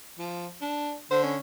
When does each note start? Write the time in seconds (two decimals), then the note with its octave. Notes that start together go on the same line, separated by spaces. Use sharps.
0.19 F3
0.62 D4
1.11 D3 C5
1.23 C#4